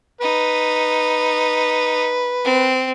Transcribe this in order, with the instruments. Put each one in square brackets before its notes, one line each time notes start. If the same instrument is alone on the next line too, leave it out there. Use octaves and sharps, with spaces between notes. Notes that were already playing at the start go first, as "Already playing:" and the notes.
[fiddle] D#4 [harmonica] B4
[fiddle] C4